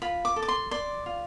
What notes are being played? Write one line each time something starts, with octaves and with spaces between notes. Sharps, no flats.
F4 B5
D6
A4
D6
C6
D5 C6
F4